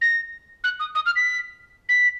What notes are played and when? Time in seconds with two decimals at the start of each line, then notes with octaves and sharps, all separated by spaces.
0.01 A#6
0.64 F#6
0.79 D#6
0.95 D#6
1.06 F6
1.16 B6
1.89 B6